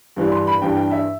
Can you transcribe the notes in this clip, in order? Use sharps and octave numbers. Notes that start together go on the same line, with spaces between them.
G2 E3 G3 D4
C6
B5
G2 E3 G3 D4 G5
G5
E5